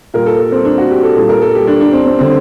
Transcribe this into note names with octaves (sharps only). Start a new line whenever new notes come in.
A#2 G3 A#4
A4
A4
C4
D4
F#4
G4
A4
A#2 G3 A4
A#4
A4
G4
D4
D4
C4
C4
D3 G3 C4